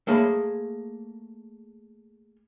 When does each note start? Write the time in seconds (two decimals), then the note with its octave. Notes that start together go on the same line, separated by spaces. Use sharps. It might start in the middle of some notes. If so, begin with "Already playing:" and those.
0.07 A3 A#3 G#4 C#5 B5